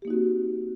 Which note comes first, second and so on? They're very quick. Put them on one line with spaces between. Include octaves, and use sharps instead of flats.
G4 A#3 D#4 F#4 C4